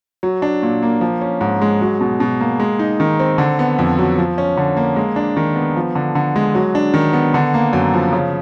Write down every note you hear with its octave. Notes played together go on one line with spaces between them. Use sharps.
F#3
D4
A#2
A#3
F3
C#4
G#2
G#3
F#3
B2
B2
A#3
G#3
D#4
D#3
C4
D3
B3
F2
F#3
F3
C#4
D3
A#3
G#3
D4
D#3
B3
F3
D3
D3
G#3
F#3
D4
D#3
B3
D3
A#3
F#2
F3
C#3